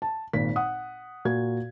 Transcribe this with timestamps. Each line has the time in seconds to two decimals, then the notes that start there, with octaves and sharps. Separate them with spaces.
0.02 A5
0.33 G#1 A#2 B6
0.56 F#5 D#6
1.25 A#2 F#4 G#6